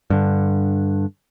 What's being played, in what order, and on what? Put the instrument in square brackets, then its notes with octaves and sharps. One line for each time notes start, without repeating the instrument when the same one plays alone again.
[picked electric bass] G2 D3